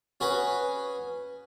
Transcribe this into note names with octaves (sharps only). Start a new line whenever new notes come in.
C#4 F#4 G#4 B4